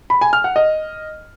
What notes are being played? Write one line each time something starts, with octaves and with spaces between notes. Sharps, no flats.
B5
G#5
F6
F#5
D#5